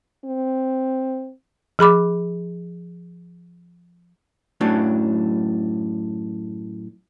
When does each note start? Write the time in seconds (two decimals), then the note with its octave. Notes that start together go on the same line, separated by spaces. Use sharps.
0.24 C4
1.79 F3 G#4 B5 D6
4.61 F#2 A2 F#3 D4